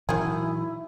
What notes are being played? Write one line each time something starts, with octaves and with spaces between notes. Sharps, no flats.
A#2 D#3 E3 F#3 E4 G#4